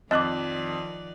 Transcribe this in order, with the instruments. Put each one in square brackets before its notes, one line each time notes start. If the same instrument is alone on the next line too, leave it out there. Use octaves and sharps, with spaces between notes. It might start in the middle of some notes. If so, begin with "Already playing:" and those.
[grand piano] F2 F#6 F#7 [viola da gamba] D#3 F3 D5 [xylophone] D#5 D6